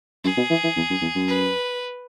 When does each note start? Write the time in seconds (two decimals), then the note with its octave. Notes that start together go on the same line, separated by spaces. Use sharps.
0.24 F#2 G#4
0.37 B2
0.50 E3
0.63 E3
0.76 E2
0.90 F#2
1.02 E2
1.15 F#2
1.28 B4